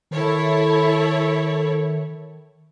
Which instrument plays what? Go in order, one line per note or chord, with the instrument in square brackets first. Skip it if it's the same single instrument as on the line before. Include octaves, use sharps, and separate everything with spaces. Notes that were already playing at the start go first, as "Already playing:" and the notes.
[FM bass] D#3 [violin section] E4 A4 C#5